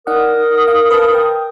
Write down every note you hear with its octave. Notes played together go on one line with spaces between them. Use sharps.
D#4 A#4 D5 F#5 D#6
F5
B4 F5 A5
G5